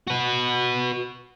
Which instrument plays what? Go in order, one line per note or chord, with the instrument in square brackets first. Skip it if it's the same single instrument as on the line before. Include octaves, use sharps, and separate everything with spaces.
[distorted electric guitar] F#4 B4